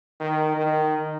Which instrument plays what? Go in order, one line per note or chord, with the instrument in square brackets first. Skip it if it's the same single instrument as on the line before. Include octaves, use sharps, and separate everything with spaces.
[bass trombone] D#3
D#3